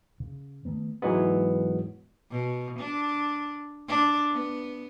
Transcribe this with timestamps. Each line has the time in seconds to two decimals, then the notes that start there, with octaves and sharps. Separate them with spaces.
0.20 C#3
0.65 D#3 A3 B3
1.02 G#2 E3 F#3 G#3 B3
2.31 B2
2.79 D4
3.88 D4
4.31 B3